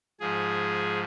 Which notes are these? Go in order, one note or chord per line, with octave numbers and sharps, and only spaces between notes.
G#2 F3 G#4